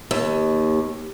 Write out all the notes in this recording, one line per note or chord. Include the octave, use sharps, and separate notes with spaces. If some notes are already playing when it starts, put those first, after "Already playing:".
D#2